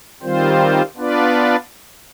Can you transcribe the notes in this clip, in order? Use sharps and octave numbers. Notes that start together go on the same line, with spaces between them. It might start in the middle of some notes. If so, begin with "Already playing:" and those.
D#3 G3 C4 F4 C5
B3 D4 F4 B4 D5